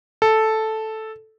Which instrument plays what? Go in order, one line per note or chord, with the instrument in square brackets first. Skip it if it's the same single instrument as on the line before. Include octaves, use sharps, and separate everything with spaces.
[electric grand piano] A4